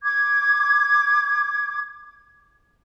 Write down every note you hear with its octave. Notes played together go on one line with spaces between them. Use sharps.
D6 G#6